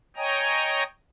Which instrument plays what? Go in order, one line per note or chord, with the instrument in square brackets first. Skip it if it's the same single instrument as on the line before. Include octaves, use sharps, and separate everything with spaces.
[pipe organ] C#5 D#5 G5 G#5 A#5 D#6